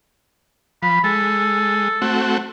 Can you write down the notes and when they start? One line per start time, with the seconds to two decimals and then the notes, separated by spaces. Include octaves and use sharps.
0.83 F3 B5
1.04 G#3 A4
2.02 A3 C4 F#4